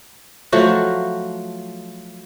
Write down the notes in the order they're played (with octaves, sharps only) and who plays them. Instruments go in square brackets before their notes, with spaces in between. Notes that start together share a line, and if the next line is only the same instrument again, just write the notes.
[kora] F3 F#3 A3 F#4